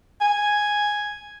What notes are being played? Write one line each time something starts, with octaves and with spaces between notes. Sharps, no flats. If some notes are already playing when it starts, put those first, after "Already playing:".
G#5